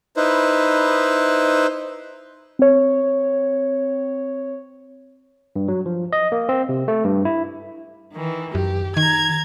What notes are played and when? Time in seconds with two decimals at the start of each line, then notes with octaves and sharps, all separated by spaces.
0.17 D#4 E4 B4 C5
2.59 C4 C#5
5.56 G2
5.68 F#3
5.86 F3
6.13 D#5
6.32 A#3
6.49 C4
6.69 C3
6.88 A3
7.04 G2
7.25 E4
8.12 D#3 E3
8.55 F#2 G4
8.97 D#3 A#5 G#6